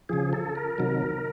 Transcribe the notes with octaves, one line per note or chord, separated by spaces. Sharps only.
C#3 F3 G#4
A4
A#4
C3 D#3 F#3